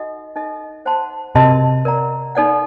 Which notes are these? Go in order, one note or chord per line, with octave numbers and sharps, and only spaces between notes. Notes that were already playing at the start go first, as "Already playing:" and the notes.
Already playing: D#4 F#4 A4 D#5 F#5
D#4 A4 D#5
C5 F#5 A5 C6
C3 F#4 A#4 D#5 A5 C6
A#4 D5 F#5 A#5
D#4 A4 D5 F#5